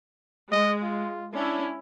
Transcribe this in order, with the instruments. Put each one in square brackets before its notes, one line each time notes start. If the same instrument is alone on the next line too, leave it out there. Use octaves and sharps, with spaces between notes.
[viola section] G#3 [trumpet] D#5
[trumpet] F4
[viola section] C#4 E4 [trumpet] D4